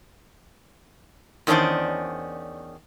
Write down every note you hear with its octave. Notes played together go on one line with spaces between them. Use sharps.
E2 D#3 C#4 D4 C5 D5